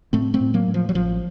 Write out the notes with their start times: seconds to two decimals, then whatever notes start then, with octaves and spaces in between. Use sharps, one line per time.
0.13 A2 A3 C4
0.34 A3 C4
0.40 A2
0.54 F#3 A#3
0.68 A2
0.74 F3
0.89 F#3
0.95 A1 F3